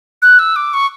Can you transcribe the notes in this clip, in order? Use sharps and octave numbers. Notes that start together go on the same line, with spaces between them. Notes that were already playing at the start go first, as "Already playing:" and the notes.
F#6
E6
D6
C#6